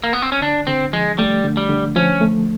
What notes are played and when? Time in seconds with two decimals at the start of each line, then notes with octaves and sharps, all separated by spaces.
0.04 A#3
0.13 B3
0.22 C4
0.32 C#4
0.41 D3 D4
0.67 D3 C4
0.93 F3 G#3
1.19 G3 A3
1.44 D3
1.57 G3
1.69 D3
1.96 F3 C#4
2.21 A3